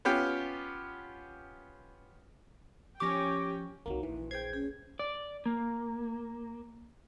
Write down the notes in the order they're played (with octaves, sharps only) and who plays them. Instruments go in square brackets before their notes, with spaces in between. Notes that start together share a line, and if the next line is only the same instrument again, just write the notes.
[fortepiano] B3 C#4 F4 G4 G5
[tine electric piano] F3 C#6 [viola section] C#4 G5 [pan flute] G4 [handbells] D6 A#6
[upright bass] C2 D#4 [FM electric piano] F#3 A#3
[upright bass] A#1 [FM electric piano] E3 [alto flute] B4
[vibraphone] G#4 C5 [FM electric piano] G5 G#6
[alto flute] C#4 [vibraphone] G#4
[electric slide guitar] D5
A#3